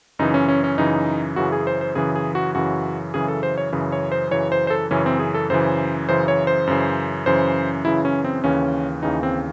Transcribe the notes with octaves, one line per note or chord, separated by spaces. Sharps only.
F#2 C#3 E3 D#4
C#4
C#4
C#4
F#2 C#3 E3 D#4
F#2 C#3 E3 F#4
G#4
C5
C5
F#2 C#3 E3 G#4
G#4
F#4
F#2 C#3 E3 F#4
F#2 C#3 E3 G#4
A4
C5
C#5
F#2 C#3 E3
C#5
C5
F#2 C#3 E3 C#5
C5
C5
A4
F#2 C#3 E3 C#4
C4
G#4
A4
F#2 C#3 E3 C5
F#2 C#3 E3 C5
C#5
C5
F#2 C#3 E3
F#2 C#3 E3 C5
F#2 C#3 E3 E4
C#4
C4
D#2 C#3 E3 C#4
D#2 C#3 E3 D#4
C4